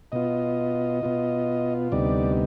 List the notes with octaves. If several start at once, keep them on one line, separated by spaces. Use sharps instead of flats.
B2 B3 F4 D#5
B2 B3 F4
D2 C3 G3 B3 D#4 D5